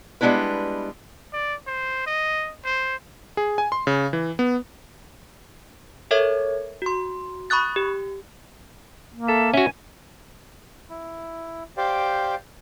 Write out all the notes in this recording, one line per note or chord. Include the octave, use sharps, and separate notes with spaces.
G3 G#3 B3 D4 E4 B4
D5
C5
D#5
C5
G#4
G#5
C6
C#3
E3
B3
A4 A#4 C#5 E5 G#6
F#4 C6
B5 C#6 D#6 F#6 A6
G4
A#3
A4 E5
C#4 F#4 E5 G#5
E4
G4 C5 D5 F5 G5